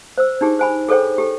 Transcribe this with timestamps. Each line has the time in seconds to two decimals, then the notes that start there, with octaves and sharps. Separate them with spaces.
0.18 C5 E6
0.41 D4 D#4 G4 G#4
0.59 C5 G#5 B5
0.89 G#4 A4 C5 C#5 G5
1.18 G4 A4